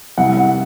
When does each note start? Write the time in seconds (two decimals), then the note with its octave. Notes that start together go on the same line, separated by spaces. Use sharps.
0.18 C2 F#5
0.37 F#5